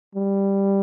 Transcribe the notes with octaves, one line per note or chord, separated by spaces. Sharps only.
G3